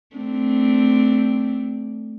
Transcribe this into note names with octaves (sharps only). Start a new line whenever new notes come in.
A3 C4 D4